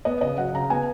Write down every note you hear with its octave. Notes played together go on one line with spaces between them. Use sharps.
B3 D#5
C#3 D#5
F#3 F#5
C#3 A#5
B3 G#5